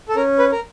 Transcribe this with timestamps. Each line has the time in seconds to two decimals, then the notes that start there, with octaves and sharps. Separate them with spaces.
0.09 A4
0.15 C#4 A#4
0.38 B4
0.52 A#4